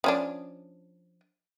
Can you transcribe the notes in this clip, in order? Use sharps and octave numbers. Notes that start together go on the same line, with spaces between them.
F3 C#4 D4